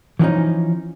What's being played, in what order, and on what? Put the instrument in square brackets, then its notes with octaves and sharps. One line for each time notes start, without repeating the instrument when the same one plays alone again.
[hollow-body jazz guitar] E3 F3 A#3 C#4 D#4